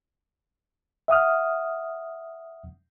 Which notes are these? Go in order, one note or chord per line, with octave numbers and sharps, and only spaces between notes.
E5 F#5 D#6 F6